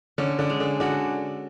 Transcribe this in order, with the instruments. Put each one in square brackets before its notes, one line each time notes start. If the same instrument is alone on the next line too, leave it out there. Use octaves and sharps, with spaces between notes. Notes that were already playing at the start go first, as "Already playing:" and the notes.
[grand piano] D3 D4 [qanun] C#4
[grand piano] D3 D4
[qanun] G#3
[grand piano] D3 D4
[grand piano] D3 D4 [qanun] F#4